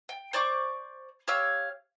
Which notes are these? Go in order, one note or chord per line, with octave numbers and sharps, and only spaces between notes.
G5
C5 D5 C#6 D6
G4 C#5 F5 E6